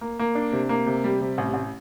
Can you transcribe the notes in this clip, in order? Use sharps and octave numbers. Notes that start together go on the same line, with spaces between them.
A#3
A#3
D4
C3
A#3
C3
G3
C3
A1
A1